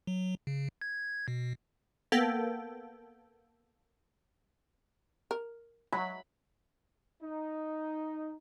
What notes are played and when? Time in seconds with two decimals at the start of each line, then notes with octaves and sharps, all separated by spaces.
0.07 F#3
0.47 C#3
0.81 G#6
1.28 B2
2.12 A#3 B3 A4 G5
5.31 A#4
5.92 F#3 B5
7.23 D#4